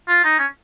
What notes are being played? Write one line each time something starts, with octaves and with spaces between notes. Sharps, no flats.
F4
D#4
C#4